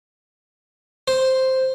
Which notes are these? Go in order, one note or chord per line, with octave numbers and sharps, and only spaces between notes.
C5